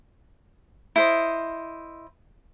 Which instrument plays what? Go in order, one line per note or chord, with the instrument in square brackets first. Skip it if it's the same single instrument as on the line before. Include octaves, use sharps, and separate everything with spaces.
[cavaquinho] E4 C5 D#5